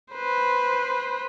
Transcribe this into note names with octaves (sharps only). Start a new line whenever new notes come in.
B4 C5